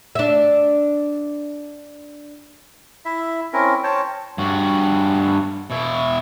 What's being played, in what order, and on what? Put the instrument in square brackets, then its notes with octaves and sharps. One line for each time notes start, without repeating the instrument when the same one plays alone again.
[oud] D4 E5
[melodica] E4 E5
C4 C#4 E4 A#4
C5 C#5 G5 A5
[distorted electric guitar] G2 F#4
B2 E4